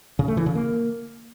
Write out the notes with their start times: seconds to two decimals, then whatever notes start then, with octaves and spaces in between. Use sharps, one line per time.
0.19 C#3
0.28 A3
0.37 E3
0.46 C#3
0.55 A#3